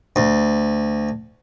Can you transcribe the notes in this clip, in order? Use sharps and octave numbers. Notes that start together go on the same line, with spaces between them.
D2